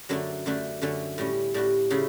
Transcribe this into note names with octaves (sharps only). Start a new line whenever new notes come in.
F#2 D3 F#3 A3 D4
F#2 D3 A3 D4
F#2 D3 A3 C#4
A2 G3 C#4
A2 G3 D4 F#4
C#3 F#3 A3 E4